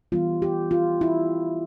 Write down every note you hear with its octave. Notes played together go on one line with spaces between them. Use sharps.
E3 G3 B3 F4
G4
F4
E4